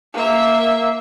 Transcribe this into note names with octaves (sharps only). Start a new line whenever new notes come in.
A#3 E5